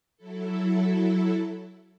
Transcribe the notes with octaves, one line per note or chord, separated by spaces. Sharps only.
F#3 E4 A4